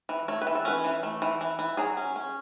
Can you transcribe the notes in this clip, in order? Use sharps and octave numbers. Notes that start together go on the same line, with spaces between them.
E3
A3 C#5
B4
E3
A4
C#4 B4
E3
A3
E3
E3
E3
F#3 G#4
C#4
C#4